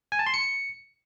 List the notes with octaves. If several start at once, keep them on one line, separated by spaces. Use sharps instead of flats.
G#5
A5
C6
C#7